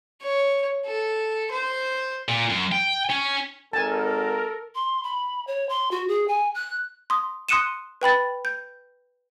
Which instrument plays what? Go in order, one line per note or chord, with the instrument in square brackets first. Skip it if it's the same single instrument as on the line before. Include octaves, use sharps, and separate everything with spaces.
[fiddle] C#5
A4
C5
[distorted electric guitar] A#2
F#2
G5
C#4
[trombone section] G#1 [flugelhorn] A4 [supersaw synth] A#4 [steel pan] G#5 A5
[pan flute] C6
B5
C#5
C6
F#4
G#4
G#5
F#6
[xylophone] C6 D#6
C6 D#6 F#6 C#7 D#7 E7
B4 G5 B5 A6
G6